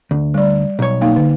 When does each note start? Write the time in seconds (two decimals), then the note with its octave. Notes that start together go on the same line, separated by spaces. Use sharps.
0.11 D2
0.34 G3 D5
0.79 B1 C#5
1.01 A#3 D#4 F5
1.16 D3